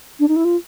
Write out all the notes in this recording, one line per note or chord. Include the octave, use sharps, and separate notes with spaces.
D4
D#4
E4
F4